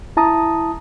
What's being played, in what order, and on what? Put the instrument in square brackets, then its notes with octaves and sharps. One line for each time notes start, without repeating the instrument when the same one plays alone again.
[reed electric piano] E4 A5 A#5 D#6